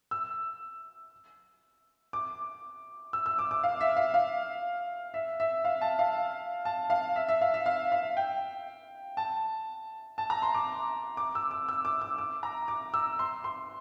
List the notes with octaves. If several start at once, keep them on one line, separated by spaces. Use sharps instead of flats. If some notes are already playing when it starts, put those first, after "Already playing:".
E6
D6
E6
E6
D6
D6
F5
E5
F5
F5
E5
E5
F5
A5
F5
A5
F5
E5
E5
F5
E5
F5
F5
G5
A5
A5
A#5
C6
D6
D6
E6
D6
E6
D6
E6
D6
A#5
D6
E6
C6
C6